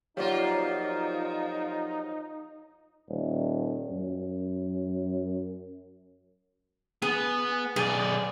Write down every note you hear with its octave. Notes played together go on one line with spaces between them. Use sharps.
F3 F#3 A#3 D#4 F4 G4 C#5 D5
D#1
F#2
B3 G#4
B1 G#4 D5